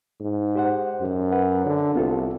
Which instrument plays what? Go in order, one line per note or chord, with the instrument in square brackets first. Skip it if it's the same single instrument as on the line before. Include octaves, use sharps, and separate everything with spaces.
[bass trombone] G#2
[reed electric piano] G4 C5 F#5
[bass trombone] F#2
[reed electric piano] B4 F#5
[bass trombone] D3
[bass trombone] C2 [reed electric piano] B3 F4 A4